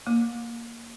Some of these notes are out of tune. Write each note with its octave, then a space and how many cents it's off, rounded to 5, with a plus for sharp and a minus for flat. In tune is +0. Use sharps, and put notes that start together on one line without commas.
A#3 +0 D6 +10